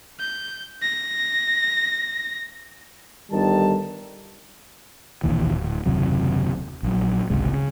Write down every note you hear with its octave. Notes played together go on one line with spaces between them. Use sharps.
G6
A#6
G1 D#3 G3 A5
E1 A#1 D#2 E3
D1
F#1 D#2 C3 F#3
A#1 F#3
G#1 C#2 C3 G#3
C#3